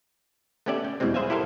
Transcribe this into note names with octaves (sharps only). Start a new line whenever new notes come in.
A3 B3 C#4 G4 D5 E5
G5
E2 B2 E3 G3 G#3 C4
G#4 B4 C5 E5 F5 G#5
E4 G4 A4 A#4 C5 F5